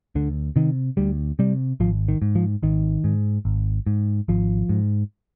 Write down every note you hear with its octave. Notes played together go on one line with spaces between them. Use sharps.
D2 D3
C3 D#3
D2 G3
C3 G3
G#1 F3
D#3
G#2
F3
G#1 D#3
G#2
G#1
G#2
G#1 F3
G#2